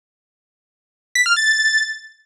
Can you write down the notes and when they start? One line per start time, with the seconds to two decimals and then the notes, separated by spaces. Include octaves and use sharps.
1.15 B6
1.26 F6
1.36 A6